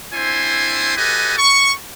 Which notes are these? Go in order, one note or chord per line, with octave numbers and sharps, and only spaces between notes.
C4 D4 E4 C5 G#5 C6
F#4 G4 A4 B4 D#5 G#5
C#6